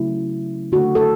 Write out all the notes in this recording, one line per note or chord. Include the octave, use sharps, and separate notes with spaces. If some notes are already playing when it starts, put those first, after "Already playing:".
Already playing: C#3 F#3 A3 E4
D3 A3 F#4
A4